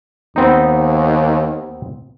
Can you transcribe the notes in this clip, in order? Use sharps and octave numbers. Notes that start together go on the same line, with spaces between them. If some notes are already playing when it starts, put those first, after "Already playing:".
D#2 B3 C4 D#4